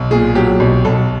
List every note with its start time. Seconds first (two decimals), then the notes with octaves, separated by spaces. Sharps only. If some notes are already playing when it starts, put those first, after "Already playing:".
Already playing: B1
0.11 A#2 G#4
0.35 F#3 G4
0.60 B1
0.85 B1 A4